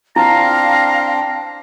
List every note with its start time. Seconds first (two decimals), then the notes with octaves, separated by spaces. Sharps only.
0.16 C4 D4 E4 F5 A#5